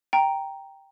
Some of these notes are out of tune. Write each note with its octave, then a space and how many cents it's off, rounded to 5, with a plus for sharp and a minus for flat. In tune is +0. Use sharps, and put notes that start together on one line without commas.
G5 +0 A#5 +0